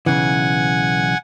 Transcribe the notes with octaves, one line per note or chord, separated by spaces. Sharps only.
B1 C#3 E3 F#5 G#5